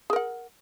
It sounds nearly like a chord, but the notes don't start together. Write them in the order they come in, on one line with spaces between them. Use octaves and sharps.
G#4 A#4 F#5